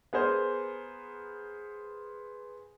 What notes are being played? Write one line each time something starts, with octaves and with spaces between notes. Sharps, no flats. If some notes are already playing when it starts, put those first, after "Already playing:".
B3 G#4 A#4 C5